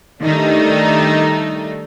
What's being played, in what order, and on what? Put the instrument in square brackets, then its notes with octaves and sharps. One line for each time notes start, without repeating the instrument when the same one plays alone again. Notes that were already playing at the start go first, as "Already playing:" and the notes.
[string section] D#3 G3 A3 D4 D#4